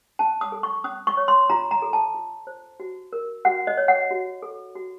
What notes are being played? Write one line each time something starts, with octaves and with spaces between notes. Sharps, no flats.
C#4 A5
D#6
A4
C#6
C#4 D#6
C#6
C#5
C6
F4 A#5
A#5
A4
A5
F4
C5
F#4
A#4
F#4 F#5
D#5
C#5
F#5
F#4
A4
F#4